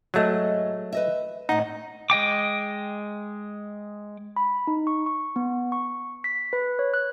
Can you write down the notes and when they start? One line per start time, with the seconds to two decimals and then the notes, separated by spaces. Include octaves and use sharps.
0.14 G#2 F#3 A3 G#4 D#5
0.93 B4 D#5 E5
1.49 A2 D#4 D#5 F#5
2.10 G#3 D#5 G5 D6
4.36 B5
4.67 D#4
4.87 C#6
5.06 C#6
5.36 B3
5.72 C#6
6.24 B6
6.53 B4
6.79 C#5
6.94 F#6